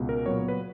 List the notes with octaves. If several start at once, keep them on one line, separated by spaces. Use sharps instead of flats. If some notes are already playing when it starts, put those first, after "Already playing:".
Already playing: C#2 B2
A#4
A#2 F#3 B3 C#5
B4